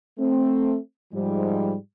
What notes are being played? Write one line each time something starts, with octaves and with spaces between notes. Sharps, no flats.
A3 C4
G#2 F3 G3